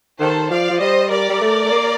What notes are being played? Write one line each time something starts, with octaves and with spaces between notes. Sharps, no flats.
D#3 A4 C5
F3 D5 F5
F3
G3 C5 D#5
G3 A#4 D5
G3
A3
A3
A#3